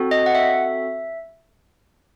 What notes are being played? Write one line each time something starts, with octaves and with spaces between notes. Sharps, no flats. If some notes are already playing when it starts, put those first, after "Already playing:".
Already playing: C4 F#4 A4
D#5
F#5
E5